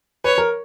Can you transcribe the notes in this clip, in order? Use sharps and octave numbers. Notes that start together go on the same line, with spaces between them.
B4 C#5
A#4